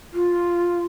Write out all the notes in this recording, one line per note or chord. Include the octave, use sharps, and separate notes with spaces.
F4